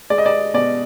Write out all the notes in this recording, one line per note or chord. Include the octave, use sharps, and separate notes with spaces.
G#3 D5
D#5
D5
B2 D5